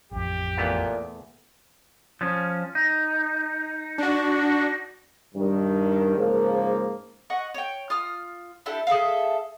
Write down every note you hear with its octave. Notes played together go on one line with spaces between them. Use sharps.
A1 F2 G4
E2 A#2 A3 B3
F3 C#4
D#4
D4 F#4
G2 D#3
G#2 C#3 F3 A#3
D#5 F#5 C#6
C#5 G5
F4 D#6 F6
D4 E4 G4 A4
G#4 A4 E5 F5